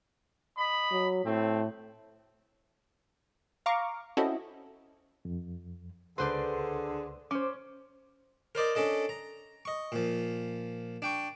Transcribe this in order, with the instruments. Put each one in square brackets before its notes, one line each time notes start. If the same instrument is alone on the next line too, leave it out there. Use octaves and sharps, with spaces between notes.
[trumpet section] D#5 B5
[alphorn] F#3
[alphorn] A2 [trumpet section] A3 C4
[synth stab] F5 A#5 C#6 D6
C4 C#4 E4 F#4 A4 D#5
[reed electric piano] F2
[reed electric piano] C#2 C6 [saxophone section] D3 G#4 [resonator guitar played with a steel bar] B4 C5 D5
[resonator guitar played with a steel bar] C#4 [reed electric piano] C5 D6
[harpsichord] A#4 C5 D5 D#5
C#4 D4 A4 D#5
A#5
D#5 C#6
A#2 F3
D4 G5 C#6